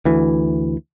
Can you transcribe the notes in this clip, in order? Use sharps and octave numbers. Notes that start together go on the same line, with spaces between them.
D2 E3